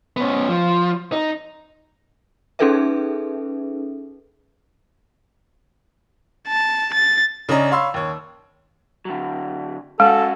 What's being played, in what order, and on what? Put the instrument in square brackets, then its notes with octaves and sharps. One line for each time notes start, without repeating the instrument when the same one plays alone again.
[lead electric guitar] B3 C#4
F3
D#4
[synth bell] C#4 D#4 G#4 A4 B4 E5
[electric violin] A5
A6
[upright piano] C#3 C#4 D4 D5 D#5 A#5
C#5 F5 B5 C6 E6
D#2 C#5
[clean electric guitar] D3 F#3
[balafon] G#3 [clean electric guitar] C#4 F#4 [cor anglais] A4